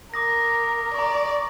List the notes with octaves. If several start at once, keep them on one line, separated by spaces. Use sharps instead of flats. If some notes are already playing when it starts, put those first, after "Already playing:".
A#4 D6 D#6 A#6
D5 A#5 C#6